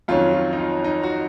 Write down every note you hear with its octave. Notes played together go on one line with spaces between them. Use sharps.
F2 D#3 F#3 C#4 F4
F4
D#4
F4
D#4
F#4